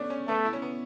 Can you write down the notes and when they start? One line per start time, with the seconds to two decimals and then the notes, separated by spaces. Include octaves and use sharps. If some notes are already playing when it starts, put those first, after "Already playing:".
Already playing: A3 B3 C#4 D4
0.10 C#4
0.27 A3 B3
0.45 E4
0.53 C#4
0.62 B3